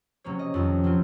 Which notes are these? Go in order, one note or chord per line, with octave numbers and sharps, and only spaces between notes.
C3 F#3 A#3 C#4 C#5
D#5
F2 D#3 F#3
C3 F#3 C4 F4